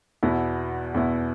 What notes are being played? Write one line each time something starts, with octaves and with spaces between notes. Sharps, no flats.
E2 B2 B3 E4
E2 B2 B3 E4